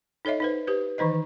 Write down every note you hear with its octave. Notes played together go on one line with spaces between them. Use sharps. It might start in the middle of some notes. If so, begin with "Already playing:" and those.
D#4 A4 C#5 D#5 E5
D#4 B4 C5
G4 B4 C5
D#3 E3 D#4 C5 D#5